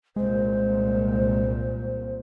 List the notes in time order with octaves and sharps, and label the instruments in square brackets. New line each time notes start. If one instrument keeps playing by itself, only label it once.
[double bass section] C2 A#2 [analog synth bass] G#3 [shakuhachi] C5